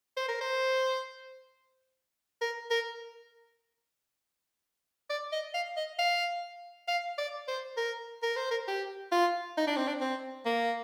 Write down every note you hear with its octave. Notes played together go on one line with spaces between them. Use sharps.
C5
A#4
C5
A#4
A#4
D5
D#5
F5
D#5
F5
F5
D5
C5
A#4
A#4
C5
A#4
G4
F4
D#4
D4
C4
D4
C4
A#3